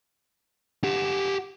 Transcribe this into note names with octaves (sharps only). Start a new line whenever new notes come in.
G4 F#5